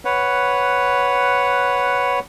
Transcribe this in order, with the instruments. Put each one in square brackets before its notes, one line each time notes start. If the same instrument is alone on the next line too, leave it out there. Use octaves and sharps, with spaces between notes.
[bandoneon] B4 C#5 F#5